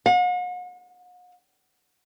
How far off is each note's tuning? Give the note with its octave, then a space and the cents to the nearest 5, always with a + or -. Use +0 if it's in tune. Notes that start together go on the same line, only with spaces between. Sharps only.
F#5 -45